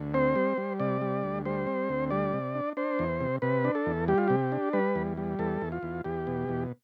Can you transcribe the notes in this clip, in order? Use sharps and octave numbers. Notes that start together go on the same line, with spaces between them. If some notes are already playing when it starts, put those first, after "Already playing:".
Already playing: D2
C4 C5
G3
G3
C3 D5
G3
D2
G3 C5
C4
D2
G3 D5
C3
D4
D4 C5
E2
C3
C3 B4
D4
A4
E2
G3 G4
F4
C3 G4
D4
G3 B4
E2
G3
E2 A4
E2
F4
E2
E2 G4
B2
E2